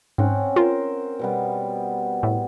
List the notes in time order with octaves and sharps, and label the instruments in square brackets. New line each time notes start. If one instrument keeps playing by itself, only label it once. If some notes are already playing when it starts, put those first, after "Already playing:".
[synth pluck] G#2 [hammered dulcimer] C4 C#4 F#5
[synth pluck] F4 [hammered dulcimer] A#4 C5
[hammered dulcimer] B2 G3 B3
[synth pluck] A2